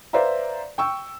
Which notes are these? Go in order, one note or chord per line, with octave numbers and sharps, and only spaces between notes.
B4 C5 D5 E5 F5 A#5
G5 C#6 E6